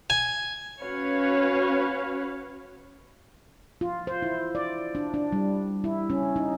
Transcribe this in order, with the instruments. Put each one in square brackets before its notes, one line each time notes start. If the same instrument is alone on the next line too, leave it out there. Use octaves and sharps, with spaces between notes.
[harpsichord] G#5
[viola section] C#4 F#4 B4 C#5 F5
[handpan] F4
C5
E4
D5
D4
D4
G3
E4
C#4
D#4